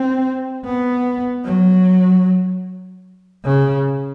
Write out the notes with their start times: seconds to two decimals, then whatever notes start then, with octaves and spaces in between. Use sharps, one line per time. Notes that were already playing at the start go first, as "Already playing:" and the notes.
Already playing: C4
0.65 B3
1.45 F#3
3.44 C#3